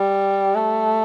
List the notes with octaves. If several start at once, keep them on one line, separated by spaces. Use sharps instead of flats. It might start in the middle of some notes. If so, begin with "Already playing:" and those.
Already playing: G3
A3